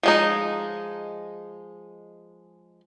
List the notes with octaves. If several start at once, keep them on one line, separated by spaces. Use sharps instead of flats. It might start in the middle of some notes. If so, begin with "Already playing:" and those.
F3 G#3 D#4